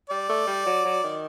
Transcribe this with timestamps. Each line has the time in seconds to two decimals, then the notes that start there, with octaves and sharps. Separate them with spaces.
0.10 G3 D5
0.29 A3
0.47 G3
0.66 F#3
0.85 F#3
1.04 D#3